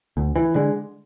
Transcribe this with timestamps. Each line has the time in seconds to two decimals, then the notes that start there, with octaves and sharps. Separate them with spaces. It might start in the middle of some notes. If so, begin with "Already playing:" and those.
0.17 D2
0.36 E3
0.55 D3 G#3